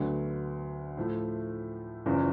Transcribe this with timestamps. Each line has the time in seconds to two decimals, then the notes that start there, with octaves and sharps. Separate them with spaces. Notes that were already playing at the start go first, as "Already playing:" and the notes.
Already playing: D2 D3 F#3 B3
0.97 A2 F3 A3
2.06 F#1 E2 C#3 F3